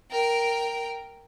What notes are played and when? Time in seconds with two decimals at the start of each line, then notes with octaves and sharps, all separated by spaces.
0.11 A#4 G5